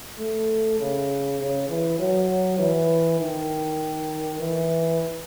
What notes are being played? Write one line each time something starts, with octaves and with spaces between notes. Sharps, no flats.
A3
C#3
C#3
E3
F#3
E3
D#3
E3